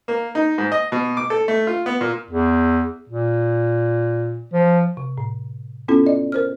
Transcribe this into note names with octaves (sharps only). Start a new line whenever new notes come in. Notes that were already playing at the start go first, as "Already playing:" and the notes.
A#3
D#4
G#2
D#5
B2
D6
A4
A3
F4
B3
A#2
E2
A#2
F3
C3
A2
B3 C#4 E4 F4 A4
D5 D#5
A#4 C5 F6